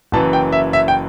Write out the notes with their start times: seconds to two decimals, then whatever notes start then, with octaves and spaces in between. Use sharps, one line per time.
0.12 F#1 F#2 E3 A5
0.33 G5
0.52 E5
0.73 E5
0.88 G5